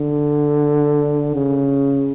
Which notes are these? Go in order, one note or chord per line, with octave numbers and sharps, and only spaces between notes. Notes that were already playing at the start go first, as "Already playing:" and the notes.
Already playing: D3
C#3